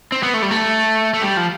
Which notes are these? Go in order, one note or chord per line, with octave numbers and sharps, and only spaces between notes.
C4
B3
A3
G3
A3
A3
G3
F3